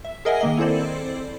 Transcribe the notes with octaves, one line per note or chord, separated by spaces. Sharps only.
E5
G#4 A#4 D#5 E5 F#5 G#5
D#3 A#3 D#5
C4 E4 A4 C5 D5